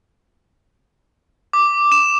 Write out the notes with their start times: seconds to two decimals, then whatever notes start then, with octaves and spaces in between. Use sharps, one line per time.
1.53 D6
1.92 E7